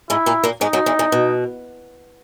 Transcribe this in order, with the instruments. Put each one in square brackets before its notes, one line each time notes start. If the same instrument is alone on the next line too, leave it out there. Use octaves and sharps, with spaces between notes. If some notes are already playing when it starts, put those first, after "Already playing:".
[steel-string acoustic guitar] G#2 G#3 [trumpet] E4
[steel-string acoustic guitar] A#2 A#3
A#2 A#3
[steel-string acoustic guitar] G#2 G#3 [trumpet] D#4
[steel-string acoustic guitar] F#2 F#3
E2 E3
E2 E3
B2